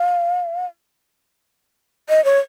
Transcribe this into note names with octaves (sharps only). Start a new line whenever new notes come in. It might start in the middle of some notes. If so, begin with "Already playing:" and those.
Already playing: F5
D#5
C#5